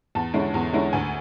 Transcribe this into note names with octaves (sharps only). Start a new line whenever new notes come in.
E2 A5
D3 G#3 C#4 E4
E2
D3 G#3 C#4 E4
D2 G#5